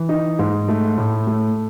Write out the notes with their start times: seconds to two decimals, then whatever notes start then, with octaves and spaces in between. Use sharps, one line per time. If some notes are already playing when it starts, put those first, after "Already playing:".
Already playing: E3
0.09 D#4
0.39 G#2
0.68 A3
0.98 A2
1.27 A3